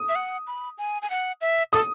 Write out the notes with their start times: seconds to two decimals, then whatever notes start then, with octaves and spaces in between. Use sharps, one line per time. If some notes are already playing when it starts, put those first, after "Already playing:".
Already playing: D#6
0.09 E5
0.15 F#5
0.47 B5
0.78 G#5
1.02 G#5
1.10 F#5
1.41 E5
1.73 A4 D#6